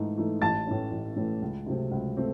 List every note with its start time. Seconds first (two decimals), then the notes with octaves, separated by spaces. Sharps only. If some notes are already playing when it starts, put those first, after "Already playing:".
Already playing: G#2 E3 A3 D#4
0.17 E3 A3 D#4
0.42 A1 A5 A6
0.67 A2 E3 A3 C#4
0.92 A1
1.16 A2 E3 A3 C#4
1.42 C#2
1.67 C3 F#3 A3 C4
1.91 C#2
2.17 A3 C4